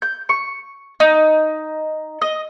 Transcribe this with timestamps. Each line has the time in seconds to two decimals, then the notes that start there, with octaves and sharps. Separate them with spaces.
0.02 G6
0.29 C#6
1.00 D#4
2.22 D#5